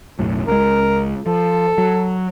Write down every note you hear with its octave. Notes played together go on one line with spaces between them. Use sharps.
B1 F#2 A2
C#2 G#3 A#4
F3 A4
F#3